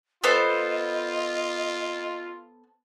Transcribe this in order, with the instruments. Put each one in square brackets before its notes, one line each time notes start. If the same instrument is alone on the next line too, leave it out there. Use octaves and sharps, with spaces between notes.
[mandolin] B3 A4 C5 [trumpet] F4 [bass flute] D#5